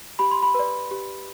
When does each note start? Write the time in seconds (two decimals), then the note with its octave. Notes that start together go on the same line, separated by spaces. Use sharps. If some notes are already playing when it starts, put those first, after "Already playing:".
0.19 G4 B5
0.31 C6
0.43 B5
0.54 B4 D5
0.91 G4